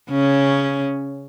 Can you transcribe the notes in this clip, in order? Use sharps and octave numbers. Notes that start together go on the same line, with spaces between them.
C#3 C#4